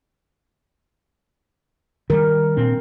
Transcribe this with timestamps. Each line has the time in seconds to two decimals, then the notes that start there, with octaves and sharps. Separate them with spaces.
2.10 D#3 G3 A#4
2.57 A#2 C4 D4